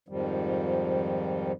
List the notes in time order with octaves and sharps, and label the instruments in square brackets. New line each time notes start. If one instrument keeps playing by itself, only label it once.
[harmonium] F2 G#2 D#3 F3 G3